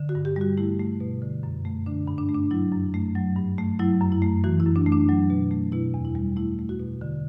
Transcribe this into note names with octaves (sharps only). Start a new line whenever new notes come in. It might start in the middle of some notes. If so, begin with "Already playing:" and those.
Already playing: D3
F#4
G2
G4
G3 F#4
A3 E4
A3
B2
D3
F#2
A3
D3 D4
G2
D4
A3
D4
F#3 E4
F#2
A3
F#3
G2
A3
F#3 E4
F#2
E4
A3
E3 F#4
E4
F#2
D4
A3
D4
F#3
B2
A3
B2 E4
E2
E4
G3
A3 E4
A3
F#4
B2
D3